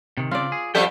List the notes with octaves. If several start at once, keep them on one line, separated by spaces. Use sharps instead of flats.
C3 D#3
C#3 C4 F4 D5
G#4
F2 G3 G4 A4 E5 G5